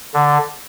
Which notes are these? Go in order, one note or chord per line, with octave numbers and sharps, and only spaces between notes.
D3